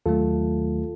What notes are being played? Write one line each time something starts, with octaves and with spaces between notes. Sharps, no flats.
D#2 D#3 F#3 A3 F4 A4